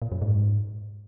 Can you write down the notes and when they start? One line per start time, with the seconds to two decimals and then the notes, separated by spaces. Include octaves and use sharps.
0.02 A#2
0.12 F#2
0.22 G#2